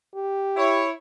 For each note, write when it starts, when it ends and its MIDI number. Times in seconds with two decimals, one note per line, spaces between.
0.15 0.83 67
0.56 0.90 64
0.56 0.90 73